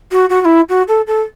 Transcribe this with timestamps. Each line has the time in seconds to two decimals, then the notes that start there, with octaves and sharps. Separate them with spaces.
0.12 F#4
0.30 F#4
0.41 F#4
0.45 E4
0.69 F#4
0.88 A4
1.07 A4